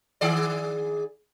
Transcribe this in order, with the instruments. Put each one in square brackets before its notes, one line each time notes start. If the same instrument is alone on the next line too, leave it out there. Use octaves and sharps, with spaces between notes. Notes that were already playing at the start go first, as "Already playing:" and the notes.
[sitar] D#3 G#4 D5